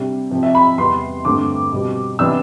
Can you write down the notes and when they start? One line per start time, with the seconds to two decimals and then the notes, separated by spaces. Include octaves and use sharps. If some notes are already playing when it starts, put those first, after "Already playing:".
Already playing: C3 G3 D4
0.31 C3 F3 C4
0.43 E5
0.55 B5
0.77 E2 C3 G3 B3 C6
1.25 G2 D3 A3 C4 D6
1.72 B2 G3 C4
2.19 C3 E3 B3 D4 E6